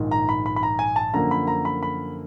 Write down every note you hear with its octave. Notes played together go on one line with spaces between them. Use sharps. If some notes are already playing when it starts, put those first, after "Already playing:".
Already playing: A#1 G#2 D#3
A#5
B5
B5
B5
A#5
G#5
A5
F#2 D3 F3 A#3 A#5
B5
A#5
B5
B5